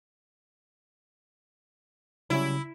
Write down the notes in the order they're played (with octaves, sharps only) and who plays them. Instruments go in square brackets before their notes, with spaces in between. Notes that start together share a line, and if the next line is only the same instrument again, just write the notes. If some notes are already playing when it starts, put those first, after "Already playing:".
[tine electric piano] C#3 [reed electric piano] F#3 G3 C#4 [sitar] E4